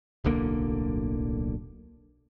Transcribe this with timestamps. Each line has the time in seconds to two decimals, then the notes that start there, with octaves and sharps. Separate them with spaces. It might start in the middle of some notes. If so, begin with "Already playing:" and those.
0.25 D1 B1 D3 A#3